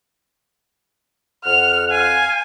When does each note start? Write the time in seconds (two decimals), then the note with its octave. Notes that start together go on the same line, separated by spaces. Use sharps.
1.45 F2 F#5 F6 F7
1.91 F5 G#5 D#7